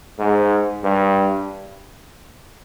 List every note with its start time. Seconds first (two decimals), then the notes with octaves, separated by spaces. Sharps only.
0.19 G#2
0.84 G2